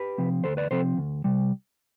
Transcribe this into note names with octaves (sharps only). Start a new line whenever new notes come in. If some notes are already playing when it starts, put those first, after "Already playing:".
Already playing: G4 B4
C3 F3 C4
D2 A4 C5
B4 D5
C3 F3 C4 A4 C5
D2
C3 G3